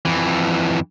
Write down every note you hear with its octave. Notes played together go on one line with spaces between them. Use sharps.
F2 E3